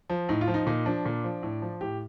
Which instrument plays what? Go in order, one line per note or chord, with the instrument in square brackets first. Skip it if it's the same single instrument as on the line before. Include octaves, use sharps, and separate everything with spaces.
[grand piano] F3
A2 D#4
F4
F3
D#4
A#2 D#4
F3 D4
A#2
F3
A2
F3
A2 G4